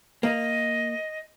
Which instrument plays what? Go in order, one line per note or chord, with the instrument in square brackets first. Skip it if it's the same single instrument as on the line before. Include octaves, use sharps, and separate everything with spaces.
[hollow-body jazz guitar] A#3 [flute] D#5